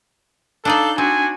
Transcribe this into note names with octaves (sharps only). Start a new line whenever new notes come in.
D4 D#4 A4 D5 F5 G6
C4 D4 F#4 G#5